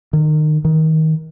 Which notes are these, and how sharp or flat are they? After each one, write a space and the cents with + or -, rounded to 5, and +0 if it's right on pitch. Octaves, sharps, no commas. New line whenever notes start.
D#3 -25
D#3 +25